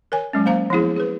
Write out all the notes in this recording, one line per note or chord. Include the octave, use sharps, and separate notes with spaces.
A#4 C#5 G#5
F#3 G#3 C#4
A#3 C5 F5 A#5
F3 B3 E4 G#4
G#4 B4